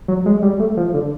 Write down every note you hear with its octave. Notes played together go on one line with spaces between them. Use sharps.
F#3
G#3
G3
A3
F3
D3